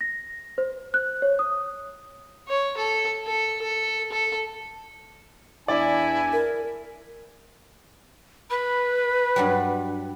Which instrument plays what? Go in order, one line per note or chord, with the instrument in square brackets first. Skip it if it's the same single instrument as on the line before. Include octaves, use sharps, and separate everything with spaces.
[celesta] A#6
C5
F#6
C#5
D#6
[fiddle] C#5
A4
A4
A4
A4
[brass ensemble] E2 D4 G#5 [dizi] E4 [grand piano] D5
[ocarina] A#4
[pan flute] B4 [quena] B5
[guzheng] G2 F#3 G3